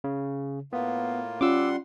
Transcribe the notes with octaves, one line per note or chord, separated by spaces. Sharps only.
C#3
A2 A#3 B3 F4
G3 C#4 F4 F#5 C6 D6 E6